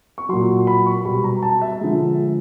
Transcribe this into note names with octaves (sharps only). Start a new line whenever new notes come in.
C#6
A#2 F#3 C6
B5
C#6
B2 G3 B5
A#5
A5
E5
D3 F3 G#3